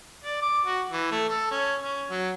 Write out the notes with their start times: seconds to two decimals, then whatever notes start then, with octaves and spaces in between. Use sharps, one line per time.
0.24 D5
0.42 D6
0.65 F#4
0.91 E3
1.11 A3
1.28 A4
1.51 C#4
1.83 C#4
2.10 F#3